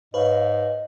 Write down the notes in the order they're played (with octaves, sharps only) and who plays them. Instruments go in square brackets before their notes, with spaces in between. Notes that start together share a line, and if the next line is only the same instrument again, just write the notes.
[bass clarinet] G#2 [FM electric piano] B4 C#5 F5 [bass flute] D#5